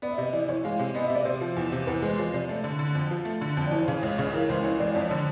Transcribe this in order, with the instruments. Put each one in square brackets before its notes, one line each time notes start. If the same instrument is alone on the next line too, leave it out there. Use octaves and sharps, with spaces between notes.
[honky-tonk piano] B3 [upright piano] D5
[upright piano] E5
[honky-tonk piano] C3 [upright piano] D#5
[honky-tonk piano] E3 [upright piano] D5
[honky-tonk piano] E3 [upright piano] C#5
[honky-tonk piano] G#3 [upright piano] F5
[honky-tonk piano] C3
[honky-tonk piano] B3 [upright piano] D#5
[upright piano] E5
[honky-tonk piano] C3
[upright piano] D5
[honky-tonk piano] C3 [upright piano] C5
[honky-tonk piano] F3
E2
C3
[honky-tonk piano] E2 [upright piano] B4
[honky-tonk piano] G#3 [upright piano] C5
[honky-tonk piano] F3 [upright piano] C#5
[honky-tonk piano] C3 [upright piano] D5
[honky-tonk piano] A3 [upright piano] D5
[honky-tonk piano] D3
D3
F2
F3
A3
D3
F2
[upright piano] D5
[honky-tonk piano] E3 [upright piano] C#5
[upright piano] C5
[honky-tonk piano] C#3 [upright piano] C#5
[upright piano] C5
[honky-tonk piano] C#2 [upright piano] C#5
[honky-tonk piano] C#3 [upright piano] C#5
[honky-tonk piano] E3 [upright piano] A#4
[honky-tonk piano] C#2 [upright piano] C5
[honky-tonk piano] E3 [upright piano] C#5
[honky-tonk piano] C#2 [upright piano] D5
[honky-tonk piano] F2 [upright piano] D5
[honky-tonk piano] D3 [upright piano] C#5